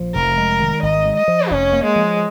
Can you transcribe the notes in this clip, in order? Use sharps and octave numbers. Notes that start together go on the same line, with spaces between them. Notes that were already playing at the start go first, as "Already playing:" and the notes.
Already playing: A#1 F3
F1 A#4
G#3
D#3
G#1 D#5
G#3
D#5
F3
F1 C#4
A#3
G#3
F3